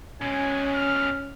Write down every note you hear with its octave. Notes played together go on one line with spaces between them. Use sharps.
B2 G#3 C#4 G#5
F6